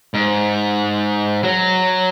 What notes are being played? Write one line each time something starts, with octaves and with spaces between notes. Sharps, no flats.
G#2
F#3